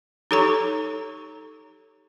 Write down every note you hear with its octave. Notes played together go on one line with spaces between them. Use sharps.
D#4 G4 A4 C#5 A#5 C#6